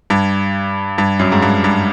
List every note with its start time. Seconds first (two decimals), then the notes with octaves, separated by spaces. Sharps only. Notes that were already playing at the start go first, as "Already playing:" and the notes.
0.10 G2
0.98 G2
1.19 F#2
1.32 G#2
1.42 G2
1.64 G2